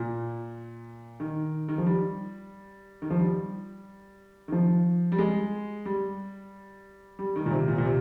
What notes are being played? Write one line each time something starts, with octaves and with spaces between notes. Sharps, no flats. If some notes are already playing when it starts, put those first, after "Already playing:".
Already playing: A#2
D#3
D#3
F3
G3
D#3
F3
G3
D#3
F3
G3
G#3
G3
G3
D#3
A#2
C3
A#2
A#2
C3